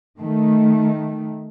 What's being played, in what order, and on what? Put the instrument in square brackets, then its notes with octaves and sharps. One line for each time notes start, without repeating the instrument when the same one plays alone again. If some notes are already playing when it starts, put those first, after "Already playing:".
[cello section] D#3 A3